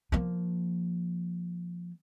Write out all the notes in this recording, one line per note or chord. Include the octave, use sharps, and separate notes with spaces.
F3 A#3